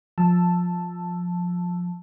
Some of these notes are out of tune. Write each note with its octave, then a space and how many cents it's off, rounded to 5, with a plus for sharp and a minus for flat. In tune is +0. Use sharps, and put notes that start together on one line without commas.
F3 +20 A5 +0 E6 +5